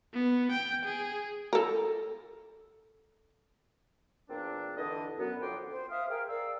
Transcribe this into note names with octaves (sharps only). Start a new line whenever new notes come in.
B3
G5
G#4
A4 A#4
E2 A#2 C4 D4
G2 D3 E3 D4 D#5
F#2 B3
F2 D3 F#3 G5 C6 D6
C5
E5 F5 D#6 F6
G#4 A#4 G5 F6
A#4 D5 F5 E6